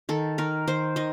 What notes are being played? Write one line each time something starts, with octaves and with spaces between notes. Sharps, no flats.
D#3 A4
D#3 A#4
D#3 C5
D#3 D#5